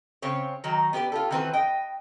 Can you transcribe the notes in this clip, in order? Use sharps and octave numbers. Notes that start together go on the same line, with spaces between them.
C#3 C4 C#5
D#3 F#3 D#4
B3 G4 B4 D5
F4 G4 A4
D#3 E3 C4 F#4 B4
D#5 G5